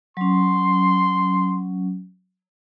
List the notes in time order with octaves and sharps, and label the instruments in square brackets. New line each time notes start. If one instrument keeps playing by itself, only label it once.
[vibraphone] F#3 C#4 [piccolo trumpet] C6